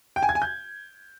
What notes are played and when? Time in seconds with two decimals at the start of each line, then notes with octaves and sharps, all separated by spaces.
0.16 G5
0.23 G#5
0.29 G#6
0.35 G#5
0.42 G6